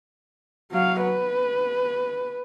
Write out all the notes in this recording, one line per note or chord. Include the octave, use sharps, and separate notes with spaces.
F#3 F5
B4